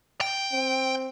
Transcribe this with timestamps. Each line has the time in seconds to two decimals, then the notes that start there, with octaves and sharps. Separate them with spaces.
0.21 G5
0.53 C4